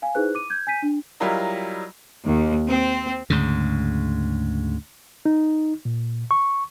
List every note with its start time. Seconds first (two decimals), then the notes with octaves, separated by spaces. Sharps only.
0.02 F5 G#5
0.15 D#4 E4 G#4 B4 C5 F#6
0.35 D6 D#7
0.50 G6 G#6
0.67 G#5 G6 B6 D#7
0.82 D4
1.20 F#3 G3 E4 F4 A#4 D#5
2.24 D#2
2.69 C4
3.30 D2 G#2 C#3
5.25 D#4
5.85 A#2
6.31 C#6